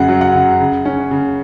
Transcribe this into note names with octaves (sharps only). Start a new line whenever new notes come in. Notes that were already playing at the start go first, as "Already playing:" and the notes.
Already playing: F#2 C#3 F#5
F#3
F#5
C#3
C#3
C#4
C#3